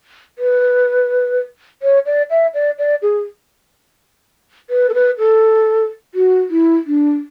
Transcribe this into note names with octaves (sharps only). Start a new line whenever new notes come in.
B4
C#5
D5
E5
D5
D5
G#4
B4
A4
B4
A4
F#4
E4
D4